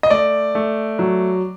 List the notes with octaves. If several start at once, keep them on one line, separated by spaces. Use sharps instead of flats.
D#5
A3 D5
A3
F#3